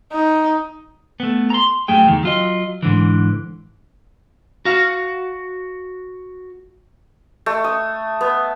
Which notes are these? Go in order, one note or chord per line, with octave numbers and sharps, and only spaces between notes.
D#4
A3 B3
A#5 C6
F#2 A3 G#4 G5
E2 D#3
F#3 F4 D#5
G#2 D3 E3
F#4 F5
A3
D#6
B3